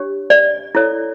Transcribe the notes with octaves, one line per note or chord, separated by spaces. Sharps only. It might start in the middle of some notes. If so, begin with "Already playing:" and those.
Already playing: D4 G4 C#5
D5
E4 A4 C#5